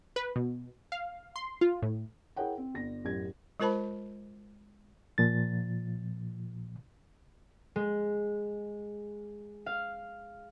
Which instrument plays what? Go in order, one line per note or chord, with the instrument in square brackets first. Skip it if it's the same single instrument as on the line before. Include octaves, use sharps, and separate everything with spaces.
[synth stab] B4
B2
F5
C6
F4
A2
[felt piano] E4 G#4 A#4 C#5 F#5 G5
C4
G1 A#6
A1 F#2 G4 G#6
[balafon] G#3 F4 A#4 C5 A5 B5
[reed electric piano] A#2 F3 A6
[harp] G#3
F5